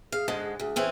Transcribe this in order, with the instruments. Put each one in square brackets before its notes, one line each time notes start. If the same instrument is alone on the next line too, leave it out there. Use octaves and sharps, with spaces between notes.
[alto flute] G#4 [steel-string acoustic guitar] F5
[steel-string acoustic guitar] G#2 D3 G#3
[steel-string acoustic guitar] D2 [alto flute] G#4
[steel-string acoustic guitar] E3 C4 C#4